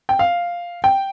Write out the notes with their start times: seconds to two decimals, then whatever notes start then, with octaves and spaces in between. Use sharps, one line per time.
0.09 G5
0.19 F5
0.84 G5